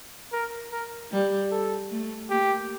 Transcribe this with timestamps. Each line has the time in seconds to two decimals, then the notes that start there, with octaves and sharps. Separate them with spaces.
0.33 A#4
0.71 A#4
1.12 G3
1.51 A4
1.91 A3
2.30 A#3 G4